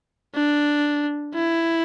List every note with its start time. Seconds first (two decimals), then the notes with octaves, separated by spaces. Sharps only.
0.35 D4
1.35 E4